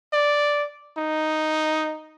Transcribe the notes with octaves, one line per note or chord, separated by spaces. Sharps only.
D5
D#4